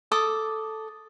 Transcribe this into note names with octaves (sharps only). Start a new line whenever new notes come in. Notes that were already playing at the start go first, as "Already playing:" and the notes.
A4 D6 D#6